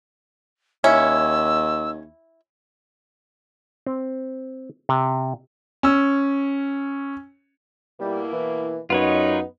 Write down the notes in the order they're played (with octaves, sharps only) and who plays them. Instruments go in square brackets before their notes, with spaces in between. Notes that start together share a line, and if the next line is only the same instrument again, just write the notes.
[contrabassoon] D#2 [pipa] C#4 [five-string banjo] E4 [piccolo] E6
[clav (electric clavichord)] C4
C3
[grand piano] C#4 E6
[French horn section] B2 A#3 E4 [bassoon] G3
[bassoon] E3
[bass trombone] F#2 [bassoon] B3 [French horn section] D#4 [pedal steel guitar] F4 B4 C#5